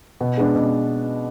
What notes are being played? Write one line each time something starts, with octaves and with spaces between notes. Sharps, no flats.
B2
G#3 B3 D4
B2